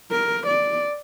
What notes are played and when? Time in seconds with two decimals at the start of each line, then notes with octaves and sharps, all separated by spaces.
0.11 A#4
0.47 D5